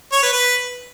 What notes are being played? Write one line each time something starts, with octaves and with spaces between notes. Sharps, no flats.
C#5
B4
B4